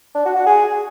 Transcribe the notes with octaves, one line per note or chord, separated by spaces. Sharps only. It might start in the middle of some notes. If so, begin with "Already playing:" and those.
D4
F#4
F#4
G#4